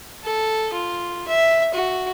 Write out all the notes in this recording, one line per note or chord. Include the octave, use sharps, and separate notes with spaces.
A4
F4
E5
F#4